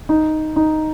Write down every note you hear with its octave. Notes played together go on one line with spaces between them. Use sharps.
D#4
D#4